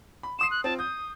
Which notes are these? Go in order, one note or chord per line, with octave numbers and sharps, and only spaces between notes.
B5
C6 D#6 C7 E7
F#6
C4 F4 A5
D#6 G6